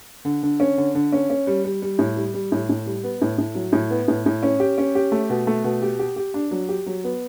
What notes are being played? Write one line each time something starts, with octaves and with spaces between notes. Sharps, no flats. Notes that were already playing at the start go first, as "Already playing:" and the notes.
D3
D3
C#4
D3
D3
C#4
C#4
G3
G3
G3
A2
G3
G3
A2
A2
G3
B3
A2
A2
F#3
A2
B3
A2
A2
C#4
G4
C#4
G4
A3
B2
A3
B2
G4
G4
G4
D4
F#3
G4
F#3
B3